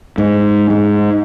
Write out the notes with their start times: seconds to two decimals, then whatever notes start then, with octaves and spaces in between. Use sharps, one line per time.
0.18 G#2
0.70 G#2